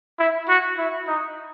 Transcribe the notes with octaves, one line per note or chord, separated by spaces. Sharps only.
E4
F#4
E4
D#4